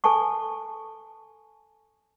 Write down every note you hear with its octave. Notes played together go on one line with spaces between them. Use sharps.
A4 G#5 A5 C#6